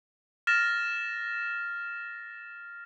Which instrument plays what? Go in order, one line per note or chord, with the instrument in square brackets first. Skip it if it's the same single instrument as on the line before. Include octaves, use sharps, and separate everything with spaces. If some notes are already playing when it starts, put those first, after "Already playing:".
[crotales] F6 A6 A#6 E7